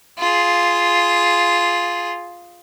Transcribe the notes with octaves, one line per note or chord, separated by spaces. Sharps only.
F4 G#4